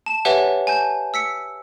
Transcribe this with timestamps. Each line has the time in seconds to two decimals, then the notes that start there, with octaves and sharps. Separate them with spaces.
0.06 A5 E7
0.25 G4 B4 C#5 E5 F#5 G#5
0.67 G#5 A5 G6
1.14 E6 B6 C#7